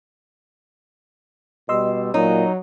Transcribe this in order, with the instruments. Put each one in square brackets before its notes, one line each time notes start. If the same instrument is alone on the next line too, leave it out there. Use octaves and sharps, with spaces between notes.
[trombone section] B2 G3 [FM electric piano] D#5 C6 E6
[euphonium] A#2 [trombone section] F#3 [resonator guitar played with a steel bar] D#4 [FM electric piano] C#5